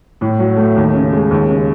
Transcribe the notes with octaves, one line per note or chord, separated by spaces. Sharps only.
A2
F#3
A3
D#2
C#3
G#3
D#2
C#3